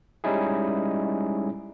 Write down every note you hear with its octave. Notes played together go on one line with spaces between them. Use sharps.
G3 G#3 C#4 D#4 E4 G#4